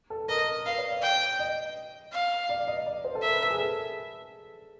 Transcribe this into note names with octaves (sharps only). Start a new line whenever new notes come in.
A4
A#4 D#5
B4 F5
C#5
D5
G5
D#5
F5
D5
D#5
D5
C5
A4
A#4 E5
B4
A#4
G#4
A4